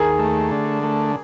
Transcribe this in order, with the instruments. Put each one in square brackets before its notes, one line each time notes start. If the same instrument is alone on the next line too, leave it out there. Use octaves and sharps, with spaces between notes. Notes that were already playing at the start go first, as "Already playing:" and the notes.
Already playing: [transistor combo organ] D#2 [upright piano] G#4 A#4
[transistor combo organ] A3
D3
A3